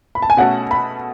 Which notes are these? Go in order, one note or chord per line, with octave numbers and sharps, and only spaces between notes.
B5
A5
G#5
B2 A3 C#4 F#4 A4 F#5
B5